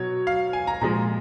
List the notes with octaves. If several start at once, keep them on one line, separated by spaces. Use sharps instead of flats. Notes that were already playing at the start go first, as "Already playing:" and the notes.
Already playing: B2 F#3 C#5
F5
G#5
A#5
A#2 F3 G#3 A#5